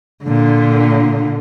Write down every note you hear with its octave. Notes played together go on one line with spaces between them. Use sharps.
A#2 D3